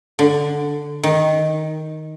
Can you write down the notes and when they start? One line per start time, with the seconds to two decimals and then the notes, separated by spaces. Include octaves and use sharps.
0.19 D3
1.03 D#3